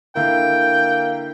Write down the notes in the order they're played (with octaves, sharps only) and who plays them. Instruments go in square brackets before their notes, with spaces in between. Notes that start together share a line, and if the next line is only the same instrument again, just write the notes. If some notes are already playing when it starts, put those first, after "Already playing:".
[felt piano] D3 E4 [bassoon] A#3 [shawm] G5